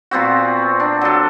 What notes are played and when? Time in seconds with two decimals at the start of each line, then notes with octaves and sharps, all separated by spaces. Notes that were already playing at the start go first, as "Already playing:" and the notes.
0.11 A#2 B3 C4 F#4
0.80 D4
1.01 F#3 A4